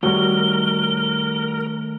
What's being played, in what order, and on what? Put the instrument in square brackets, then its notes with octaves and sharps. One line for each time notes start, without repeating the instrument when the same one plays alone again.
[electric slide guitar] D#3 A3 C#5 [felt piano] G3 F#4 [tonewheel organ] A#4 [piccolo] G7